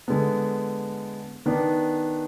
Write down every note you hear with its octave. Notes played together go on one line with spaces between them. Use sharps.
D3 G#3 B3
D#3 B3 D4